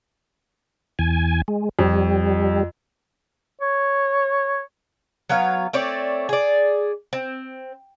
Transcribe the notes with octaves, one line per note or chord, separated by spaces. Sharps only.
E2 G#5
G#3
F2 G3
C#5
F#3 B3 C#5 F5
A3 C4 C#5 D5
G#4 D5
C4